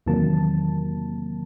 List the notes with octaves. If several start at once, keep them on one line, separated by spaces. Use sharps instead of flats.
E2 C3 D#3 F#3 A#3 A5